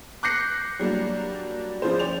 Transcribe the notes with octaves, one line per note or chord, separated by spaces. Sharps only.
D6 F#6 G6 A#6 C7 C#7
F#3 G3 A#3 D4
C#3 F3 F4 C5
C#4 D5 F7